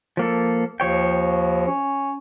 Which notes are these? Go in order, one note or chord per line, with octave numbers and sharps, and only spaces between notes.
F3 A#3 A4
D#2 F3 C#5 G5
C#4